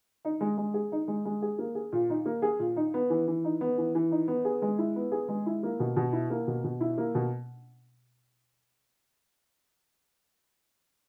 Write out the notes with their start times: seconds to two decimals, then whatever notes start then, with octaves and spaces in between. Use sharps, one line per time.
0.25 D#4
0.41 G#3
0.58 G#3
0.74 G#4
0.92 D#4
1.08 G#3
1.25 G#3
1.42 G#4
1.58 A#3
1.75 G#4
1.92 A#2
2.10 D#4
2.26 A#3
2.42 G#4
2.59 A#2
2.76 D#4
2.94 B3
3.10 E3
3.28 E3
3.44 D#4
3.61 B3
3.78 E3
3.95 E3
4.12 D#4
4.28 B3
4.45 G#4
4.62 G#3
4.78 E4
4.96 B3
5.12 G#4
5.28 G#3
5.46 E4
5.63 A#3
5.80 B2
5.96 B2
6.13 E4
6.30 A#3
6.47 B2
6.64 B2
6.80 E4
6.98 A#3
7.15 B2